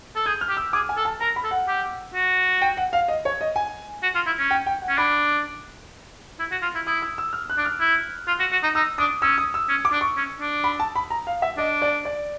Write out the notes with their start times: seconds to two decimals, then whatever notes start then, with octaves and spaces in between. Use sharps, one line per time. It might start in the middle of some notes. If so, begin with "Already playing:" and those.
0.16 A4
0.26 G#4 G6
0.41 F6
0.49 G4
0.57 E6
0.73 G#4 D6
0.89 G#5
0.97 A4
1.05 A5
1.21 A#4 A#5
1.36 B5
1.44 A4
1.51 F#5
1.68 G4
2.14 F#4
2.62 G5
2.77 F#5
2.93 F5
3.08 D#5
3.25 C#5
3.41 D#5
3.56 G#5
4.03 F#4
4.15 F4
4.26 E4
4.38 C#4
4.51 G5
4.66 G5
4.82 F#5
4.88 C#4
4.98 D4 B5
6.39 E4
6.51 F#4
6.62 F4
6.75 E4
6.86 E4 D#6
7.02 E6
7.18 E6
7.33 F6
7.50 F#6
7.58 D4
7.65 F6
7.80 E4
8.27 F4
8.40 F#4
8.52 F#4
8.63 D#4
8.75 D#4 E6
8.98 D4 D#6
9.22 C#4 E6
9.38 D#6
9.54 E6
9.69 C#4
9.85 D6
9.92 D4
10.01 C#6
10.17 C#4
10.40 D4
10.64 B5
10.80 A5
10.96 B5
11.10 A#5
11.27 F5
11.42 E5
11.57 D4 D#5
11.82 D5
12.05 D5